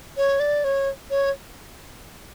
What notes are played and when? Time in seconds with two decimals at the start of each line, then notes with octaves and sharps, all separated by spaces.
0.17 C#5
0.40 D5
0.64 C#5
1.11 C#5